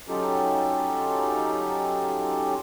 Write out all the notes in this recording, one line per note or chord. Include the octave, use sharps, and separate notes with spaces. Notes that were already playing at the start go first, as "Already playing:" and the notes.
F#3 C#4 D#4 F4 G4 A4